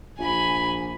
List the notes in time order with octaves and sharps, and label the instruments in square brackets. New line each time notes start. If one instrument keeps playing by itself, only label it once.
[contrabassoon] A#1 [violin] G#5 B5